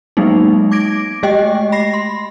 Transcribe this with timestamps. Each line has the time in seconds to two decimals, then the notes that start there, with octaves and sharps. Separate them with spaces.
0.17 F#3 G#3 A#3 B3 D#4
0.71 D6 G#6 A#6 D7
1.23 G#3 A3 G4 D#5 G5
1.72 B5 A#6 C7
1.94 C6